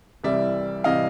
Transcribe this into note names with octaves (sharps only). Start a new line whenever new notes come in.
C2 C3 E3 G3 D5 E5
C3 E3 G3 D#5 F5